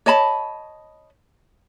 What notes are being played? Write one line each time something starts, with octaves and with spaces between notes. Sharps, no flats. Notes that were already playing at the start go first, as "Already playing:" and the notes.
C#5 D#5 A5 B5